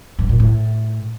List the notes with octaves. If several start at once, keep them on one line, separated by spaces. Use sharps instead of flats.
G2
A#2
A2